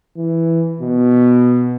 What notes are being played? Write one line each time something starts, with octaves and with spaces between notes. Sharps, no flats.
E3
B2